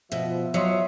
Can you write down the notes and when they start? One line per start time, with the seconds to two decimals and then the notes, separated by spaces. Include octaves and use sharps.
0.12 B2 F3 E5
0.54 F#3 C#5 D#5 E5 C6